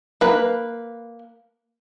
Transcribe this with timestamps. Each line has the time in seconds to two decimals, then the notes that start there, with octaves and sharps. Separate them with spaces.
0.21 A#3 B4